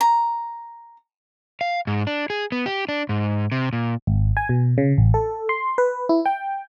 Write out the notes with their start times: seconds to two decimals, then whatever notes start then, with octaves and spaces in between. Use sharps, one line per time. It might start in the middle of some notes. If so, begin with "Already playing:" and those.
0.01 A#5
1.61 F5
1.87 G#2
2.07 D4
2.30 G#4
2.52 B3
2.66 G4
2.89 D4
3.09 G#2
3.52 C3
3.73 A#2
4.07 G#1
4.37 G#5
4.49 B2
4.78 C#3
4.98 A1
5.14 A4
5.49 C6
5.78 B4
6.09 E4
6.26 G5